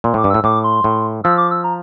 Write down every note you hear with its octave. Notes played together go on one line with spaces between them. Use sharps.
A#2 C6
A2 D6
G2
A2 E6
A2 D6
C6
A2
F3 E6
D6
E6
A#5